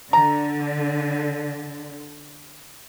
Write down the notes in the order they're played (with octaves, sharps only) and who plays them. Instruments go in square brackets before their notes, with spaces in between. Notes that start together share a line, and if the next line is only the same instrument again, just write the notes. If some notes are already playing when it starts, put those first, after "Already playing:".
[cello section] D3 [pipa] A#5